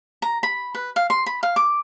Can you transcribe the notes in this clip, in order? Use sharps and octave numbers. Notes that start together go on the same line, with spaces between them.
A#5
B5
B4
F5
C6
B5
F5
D6